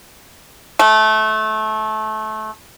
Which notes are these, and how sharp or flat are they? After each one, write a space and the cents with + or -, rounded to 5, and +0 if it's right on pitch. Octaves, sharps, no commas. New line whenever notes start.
A3 -20